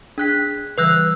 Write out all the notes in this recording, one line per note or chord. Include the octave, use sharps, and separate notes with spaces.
D4 G#4 G5 F#6 B6
C#3 E3 G3 B4 E6 F#6